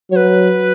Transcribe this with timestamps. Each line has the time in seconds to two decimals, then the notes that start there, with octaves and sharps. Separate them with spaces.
0.11 F#3 C#5
0.16 B4